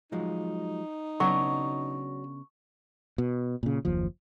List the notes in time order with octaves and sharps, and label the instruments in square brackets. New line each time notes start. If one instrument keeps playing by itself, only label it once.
[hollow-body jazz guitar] F3 F#3 G#3 [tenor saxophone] D#4
[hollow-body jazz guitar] C#3 B3 D4 [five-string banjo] F#3 [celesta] C#6
[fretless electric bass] B2
A#2 C#3
F#1 D#2 F3